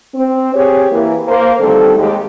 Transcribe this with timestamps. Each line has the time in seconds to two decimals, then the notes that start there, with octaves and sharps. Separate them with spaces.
0.14 C4
0.53 C4 G4 G#4 C#5
0.91 E3 A#3
1.28 A#3 C5
1.60 D3 D#3 G3 A3 C4 A4
1.98 D#2 G#3 G4